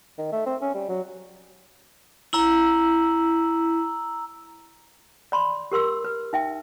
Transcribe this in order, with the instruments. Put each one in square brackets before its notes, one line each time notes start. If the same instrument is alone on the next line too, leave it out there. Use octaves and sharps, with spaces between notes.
[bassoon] D#3
A3
C4
C#4
G3
F#3
[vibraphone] E4 [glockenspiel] A#5 E6 F#7
[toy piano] D5 B5 C6
G4 A#4 C6 E6
B4
D#4 E5 G5